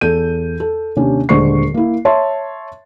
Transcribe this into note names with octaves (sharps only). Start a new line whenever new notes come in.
E2 A4 G6 D#7
A4
D#2 C3 C#4 D4
D#1 D3 G#3 C5 C#6 C7
A#3 E4
C#5 E5 A5 C6